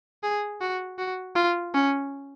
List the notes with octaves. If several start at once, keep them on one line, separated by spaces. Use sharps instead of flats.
G#4
F#4
F#4
F4
C#4